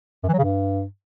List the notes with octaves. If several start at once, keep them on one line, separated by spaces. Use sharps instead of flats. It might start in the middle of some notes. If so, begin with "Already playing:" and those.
F#2
E3
F#3
C#3
G2